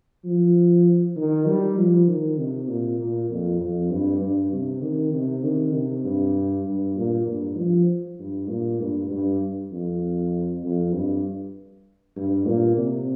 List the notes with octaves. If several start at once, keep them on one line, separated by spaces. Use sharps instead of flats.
F3
D#3
G3
F3
D#3
C3
A#2
A#2
F2
F2
G2
G2
C3
D#3
C3
D#3
C3
G2
G2
A#2
G2
F3
G2
A#2
G2
G2
F2
F2
G2
G2
A#2
C3